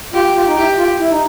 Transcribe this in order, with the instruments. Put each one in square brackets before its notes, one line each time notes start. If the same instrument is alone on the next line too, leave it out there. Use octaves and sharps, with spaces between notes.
[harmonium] F4 [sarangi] G4
[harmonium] F4
D#4
[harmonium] E4 [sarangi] G4
[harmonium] F4
E4
D#4